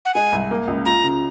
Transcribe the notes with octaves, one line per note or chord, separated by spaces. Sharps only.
F#5
G#3 G#5
C2
A#3
C#2
F4 A#5
C#3